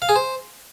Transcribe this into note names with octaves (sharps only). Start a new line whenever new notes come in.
F5
G#4
C5